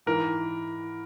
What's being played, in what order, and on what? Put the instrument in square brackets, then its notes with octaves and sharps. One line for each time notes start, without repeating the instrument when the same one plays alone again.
[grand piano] G#2 E3 A#4